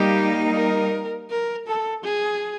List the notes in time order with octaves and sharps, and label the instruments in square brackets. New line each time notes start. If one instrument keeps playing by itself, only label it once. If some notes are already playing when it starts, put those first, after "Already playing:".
Already playing: [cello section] G3 A#3 D#4 [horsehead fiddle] G4
[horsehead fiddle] A#4
A#4
A4
G#4